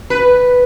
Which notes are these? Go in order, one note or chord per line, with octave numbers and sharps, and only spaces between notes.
B4